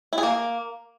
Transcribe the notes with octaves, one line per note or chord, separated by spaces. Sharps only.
E4
G#4
A#3